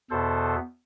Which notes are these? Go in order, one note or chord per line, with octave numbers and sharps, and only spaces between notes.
E2 B2 B3 A4 C5